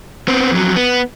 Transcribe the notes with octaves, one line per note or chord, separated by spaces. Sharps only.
B3 C4
F2 F#3
B3